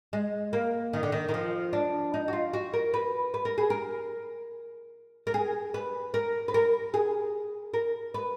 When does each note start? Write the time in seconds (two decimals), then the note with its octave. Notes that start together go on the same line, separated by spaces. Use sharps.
0.13 G#3
0.53 A#3
0.93 D#3
1.03 D3
1.12 D#3
1.29 D#3
1.34 F3
1.73 D4
2.14 D#4
2.28 F#4
2.33 F4
2.54 F#4
2.74 A#4
2.94 B4
3.34 B4
3.45 A#4
3.58 G#4
3.70 A#4
5.27 A#4
5.34 G#4
5.74 B4
6.14 A#4
6.48 B4
6.54 A#4
6.94 G#4
7.74 A#4
8.14 B4